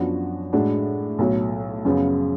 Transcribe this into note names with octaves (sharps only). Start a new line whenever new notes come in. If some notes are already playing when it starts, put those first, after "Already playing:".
Already playing: F#2 F3 B3 D4 F#4
A2 G#3 D4 F#4
B1 A2 F#3
F#2 C#3 F3 B3 F4